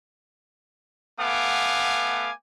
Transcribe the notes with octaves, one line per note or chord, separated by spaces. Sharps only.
A3 B3 F5 F#5 G#5 D6